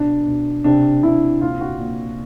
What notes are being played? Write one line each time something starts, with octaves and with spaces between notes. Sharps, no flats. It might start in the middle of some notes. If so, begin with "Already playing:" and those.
Already playing: B2 D4
B2
C3 D4
C3 E4
A#2 F4
F#4
A#2